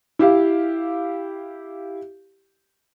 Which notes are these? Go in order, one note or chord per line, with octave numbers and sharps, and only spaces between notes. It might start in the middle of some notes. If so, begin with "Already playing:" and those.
E4 G4 F5